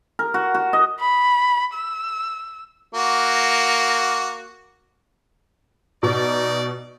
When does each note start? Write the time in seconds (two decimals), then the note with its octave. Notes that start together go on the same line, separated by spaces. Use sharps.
0.19 A#4
0.34 F#4
0.54 F#4
0.73 D#5
1.00 B5
1.74 E6
2.94 A#3 F#4
6.03 B2 D#4 D5